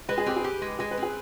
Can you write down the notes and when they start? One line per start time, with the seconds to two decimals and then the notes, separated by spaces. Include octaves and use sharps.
0.09 G#3 B4
0.18 G#4
0.26 C4 G4
0.37 G#4
0.44 G4
0.62 G#3
0.79 G#3 G#4
0.91 B4
0.97 C4
1.03 G#4